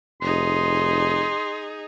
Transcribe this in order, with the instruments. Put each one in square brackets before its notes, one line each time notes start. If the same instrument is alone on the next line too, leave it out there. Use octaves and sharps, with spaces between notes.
[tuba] F1 [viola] D#4 G#4 [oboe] C6